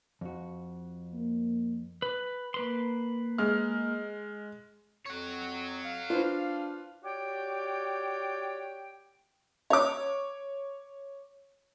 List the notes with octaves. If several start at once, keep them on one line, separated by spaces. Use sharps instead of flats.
F2 F#4
A#3
B4
A#3 B4 C6
G#3 F6
F2 C#5 F#5
F5
D4 F4 B4 C5
F#4 G4 C#5 D5 G5
C#5 D6